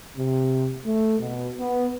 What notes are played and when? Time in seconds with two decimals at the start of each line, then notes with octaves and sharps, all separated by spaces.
0.17 C3
0.86 A3
1.19 B2
1.59 B3